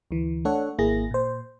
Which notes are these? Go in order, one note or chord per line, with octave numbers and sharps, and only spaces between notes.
D2 E3
A3 D4 A4 C#5 F#5
G#1 A#3 E4 G#4 A#6
A#2 C5